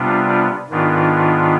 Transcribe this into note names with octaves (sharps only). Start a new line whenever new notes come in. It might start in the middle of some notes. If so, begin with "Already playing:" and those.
Already playing: C3 G3 B3 D4 F4
G#2 D#3 B3 D4 F4